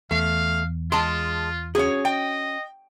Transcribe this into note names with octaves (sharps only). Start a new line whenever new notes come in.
E2 A3 F5
G#3 F4 A5 C6
C#4 F#4 G#4 C#5
D#5 G5